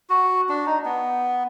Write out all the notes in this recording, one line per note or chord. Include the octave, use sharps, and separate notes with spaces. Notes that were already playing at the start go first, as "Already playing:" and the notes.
F#4
D4
D#4
B3